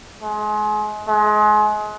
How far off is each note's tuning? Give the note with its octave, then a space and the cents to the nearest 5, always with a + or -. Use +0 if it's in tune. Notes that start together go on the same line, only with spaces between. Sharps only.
G#3 +30
G#3 +30